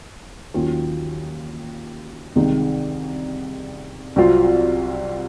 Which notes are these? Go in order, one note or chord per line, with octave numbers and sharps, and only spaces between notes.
D#2 D#3 F#3 C#4 F4
C2 C3 D#3 G#3 D#4
C2 C3 F#3 C4 F4